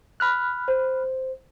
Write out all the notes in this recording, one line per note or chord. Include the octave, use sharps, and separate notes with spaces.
B5 F6 F#6
C5